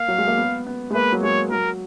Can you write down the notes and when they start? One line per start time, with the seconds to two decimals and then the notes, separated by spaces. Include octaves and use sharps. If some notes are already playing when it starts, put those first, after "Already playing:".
Already playing: A#3 F5
0.08 F#3
0.18 G#3
0.28 A#3
0.38 B3
0.67 B3
0.90 G#3
0.94 A#3 B4
1.12 F#3
1.23 G#3 C#5
1.51 F#3 A#4